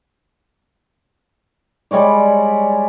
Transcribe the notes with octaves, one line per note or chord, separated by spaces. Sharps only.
G3 G#3 C#5 D5